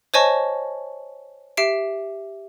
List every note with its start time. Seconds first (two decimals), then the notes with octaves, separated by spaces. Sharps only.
0.14 C5 C#5 D#5 G#5 A5 C#6
1.57 G4 E5 C7 D7